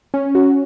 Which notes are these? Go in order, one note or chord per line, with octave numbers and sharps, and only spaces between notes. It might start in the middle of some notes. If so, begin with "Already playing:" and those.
C#4
F#4